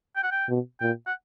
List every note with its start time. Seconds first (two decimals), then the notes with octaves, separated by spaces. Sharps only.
0.16 G5
0.23 F#5
0.31 G5
0.49 B2
0.80 A#2 G5
1.07 F#5